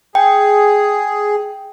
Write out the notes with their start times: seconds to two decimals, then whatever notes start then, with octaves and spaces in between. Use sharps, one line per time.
0.15 G#4 G5